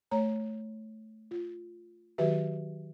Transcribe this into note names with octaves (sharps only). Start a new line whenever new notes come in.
A3 C#5 A#5
F4
D#3 F#3 F#4 G4 B4 E5